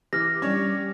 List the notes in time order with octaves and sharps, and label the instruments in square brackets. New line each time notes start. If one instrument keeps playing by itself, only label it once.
[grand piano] E3 [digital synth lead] G4 [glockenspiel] F6 A#6
[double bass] G3 [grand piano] C#4 D4 C#5